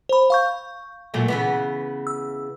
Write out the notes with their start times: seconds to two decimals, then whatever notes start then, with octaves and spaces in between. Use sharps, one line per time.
0.09 C5 B5
0.30 F5 C#6 G6
1.14 A#2 F#3 A3
1.28 C#3 E3 B3
2.07 E6